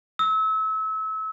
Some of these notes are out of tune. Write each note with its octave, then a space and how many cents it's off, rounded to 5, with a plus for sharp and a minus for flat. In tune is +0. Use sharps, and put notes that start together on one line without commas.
E6 -30